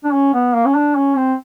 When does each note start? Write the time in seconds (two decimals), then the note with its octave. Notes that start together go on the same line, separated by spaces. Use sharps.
0.04 D4
0.13 C#4
0.34 B3
0.54 A#3
0.66 C#4
0.75 D4
0.96 C#4
1.16 C4